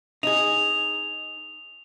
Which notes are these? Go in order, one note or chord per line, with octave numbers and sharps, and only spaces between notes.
D#4 G#4 F7